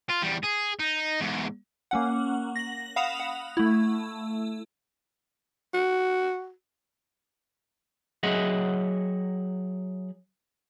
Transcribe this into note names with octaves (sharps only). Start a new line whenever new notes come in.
F4
E2 G3
G#4
D#4
E2 G#2
A#3 C#4 F#5
A#6 F#7
F5 F#5 B5 D#6 E7 F7
F#5
A3 E4
F#4
F#3 G#4 D#5 E5 F#5